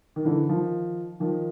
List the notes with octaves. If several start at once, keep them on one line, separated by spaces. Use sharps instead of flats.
D#3
D3 E3
D#3 F3
D#3 F3